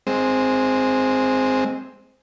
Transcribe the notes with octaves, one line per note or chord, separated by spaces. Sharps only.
G#3 C4